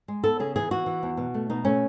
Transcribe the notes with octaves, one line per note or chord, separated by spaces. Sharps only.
G#3
B3 A4
C#3 G#4
E3 G#4
E3 F#4
E3
E2
B2
A3
B2 D#4
A3 C#4